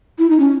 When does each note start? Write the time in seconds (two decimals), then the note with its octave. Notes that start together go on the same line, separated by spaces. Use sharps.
0.19 E4
0.30 D#4
0.40 C#4